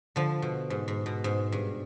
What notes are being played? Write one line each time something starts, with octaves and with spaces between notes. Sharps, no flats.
D3 F3
B2
G#2
G#2
B2
G#2
G2